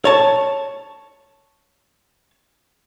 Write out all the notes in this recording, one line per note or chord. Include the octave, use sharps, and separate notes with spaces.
C#5 A5